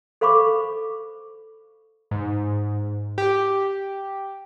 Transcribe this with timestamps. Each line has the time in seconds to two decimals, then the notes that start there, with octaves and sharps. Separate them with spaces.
0.21 A4 C5 F5 B5 C#6 D6
2.11 G#2
3.18 G4